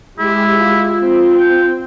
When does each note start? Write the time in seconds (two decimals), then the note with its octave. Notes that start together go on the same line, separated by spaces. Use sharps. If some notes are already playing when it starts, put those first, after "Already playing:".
0.19 G#3 E4 G4
0.57 F4
1.03 C4
1.40 G5